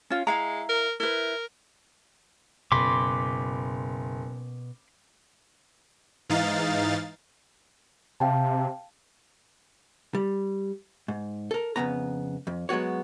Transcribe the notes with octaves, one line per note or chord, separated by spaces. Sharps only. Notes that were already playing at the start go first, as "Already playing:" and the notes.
C#4 F4
G#3 E4 F5 A#5
A#4
E4 A#4 B4
F#1 B2 B5 C6 D6
G#2 E3 D#4 F5 A6
C3 F5 G5 A5
G3
G#2
A4 A#4
F2 C#3 B3 A#5
F2
F#3 G#3 B3 F#4 C#5